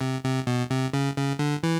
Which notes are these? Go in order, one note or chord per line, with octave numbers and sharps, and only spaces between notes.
C3
C3
B2
C3
C#3
C#3
D3
E3